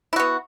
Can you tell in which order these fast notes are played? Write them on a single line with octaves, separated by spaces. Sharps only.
E4 F#4 B3